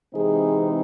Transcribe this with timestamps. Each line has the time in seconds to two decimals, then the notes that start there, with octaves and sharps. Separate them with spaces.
0.15 C3 E3 G#3 C4 D#4 G#4